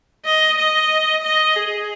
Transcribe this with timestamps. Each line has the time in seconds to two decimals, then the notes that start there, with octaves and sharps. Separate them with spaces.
0.25 D#5
0.58 D#5
1.23 D#5
1.55 G#4